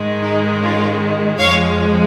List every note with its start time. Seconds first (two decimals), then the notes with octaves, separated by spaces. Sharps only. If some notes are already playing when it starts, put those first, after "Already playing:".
Already playing: G#2 D#3 G#3
0.23 D#4
0.61 C#4 F4
1.39 F2 F3 G#3 C#5 F5